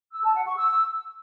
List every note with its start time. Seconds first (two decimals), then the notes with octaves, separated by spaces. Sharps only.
0.12 E6
0.24 A5
0.35 F#5
0.46 C#6
0.57 E6